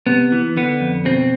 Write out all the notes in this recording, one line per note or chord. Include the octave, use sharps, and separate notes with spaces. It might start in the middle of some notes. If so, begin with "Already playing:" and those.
C3 B3
E3
D3 B3
F2
B2 C4